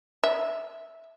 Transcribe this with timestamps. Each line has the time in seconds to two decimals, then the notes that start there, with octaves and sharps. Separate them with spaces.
0.24 E5